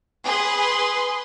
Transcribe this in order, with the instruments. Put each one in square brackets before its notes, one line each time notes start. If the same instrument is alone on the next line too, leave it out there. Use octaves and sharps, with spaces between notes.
[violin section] G#4 B4 C6